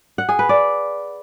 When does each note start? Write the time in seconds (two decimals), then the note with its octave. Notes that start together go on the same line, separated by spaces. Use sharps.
0.18 F#5
0.29 G#4
0.39 B4
0.49 D5